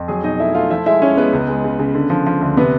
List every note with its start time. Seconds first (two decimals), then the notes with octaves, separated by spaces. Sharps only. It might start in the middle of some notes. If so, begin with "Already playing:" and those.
Already playing: F2
0.08 F#3 G#4 G#5
0.23 B2 D#4 D#5
0.39 A3 E4 E5
0.54 A3 F4 F5
0.70 F3 E4 E5
0.86 G#3 E4 E5
1.02 G#3 C#4 C#5
1.17 G#3 B3 B4
1.33 C#2
1.48 G#3
1.64 C#3
1.79 C#3
1.94 D3
2.10 F3
2.26 F3
2.41 D2
2.57 C3 B3 B4